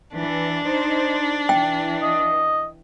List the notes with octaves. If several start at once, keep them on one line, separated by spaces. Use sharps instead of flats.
E3 D4
D#4 C5
E3 G5
D#5